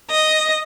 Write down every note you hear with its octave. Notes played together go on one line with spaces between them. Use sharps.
D#5